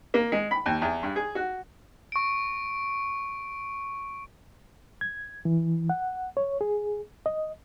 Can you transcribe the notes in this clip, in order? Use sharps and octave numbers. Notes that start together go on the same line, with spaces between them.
A#3
G#3
B5
D#2
E2
G2
G#4
F#4
C#6 D7
G#6
E3
F#5
C#5
G#4
D#5